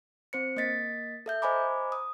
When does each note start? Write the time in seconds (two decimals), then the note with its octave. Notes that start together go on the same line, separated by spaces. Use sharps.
0.33 C4 C5 C#7
0.57 A#3 D#5 A6 B6
1.26 A4 E5 G6
1.42 C5 D#5 G#5 A#5 B5 D6
1.92 D#6